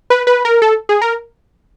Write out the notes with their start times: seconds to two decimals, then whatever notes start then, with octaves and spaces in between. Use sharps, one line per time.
0.10 B4
0.27 B4
0.45 A#4
0.62 A4
0.89 G#4
1.02 A#4